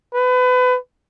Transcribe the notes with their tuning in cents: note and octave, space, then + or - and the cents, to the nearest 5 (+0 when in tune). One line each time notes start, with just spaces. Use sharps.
B4 +30